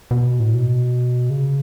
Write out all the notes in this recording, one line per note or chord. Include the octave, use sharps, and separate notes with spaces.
B2
A2
B2
C#3